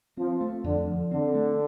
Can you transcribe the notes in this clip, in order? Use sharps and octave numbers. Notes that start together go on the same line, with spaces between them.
F3 C4
A3
F2 D3
F3
D3 C4
A3